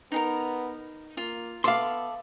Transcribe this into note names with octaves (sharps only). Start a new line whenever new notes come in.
B3 D#4 G#4 A#4
A#3 F4
B3 A4 D5 E5 F5 C6